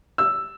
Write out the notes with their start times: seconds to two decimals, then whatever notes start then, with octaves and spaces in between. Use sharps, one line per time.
0.18 E6